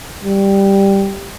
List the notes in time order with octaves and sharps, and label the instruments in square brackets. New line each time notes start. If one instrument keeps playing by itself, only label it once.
[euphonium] G3